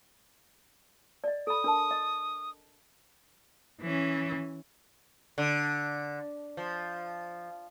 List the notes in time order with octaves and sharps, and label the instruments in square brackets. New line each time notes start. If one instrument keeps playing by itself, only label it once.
[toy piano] D5 D#5
[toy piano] A4 B5 [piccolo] D#6
[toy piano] D4 A#4 A5
D#5
[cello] E3 C#4
[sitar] D3
F3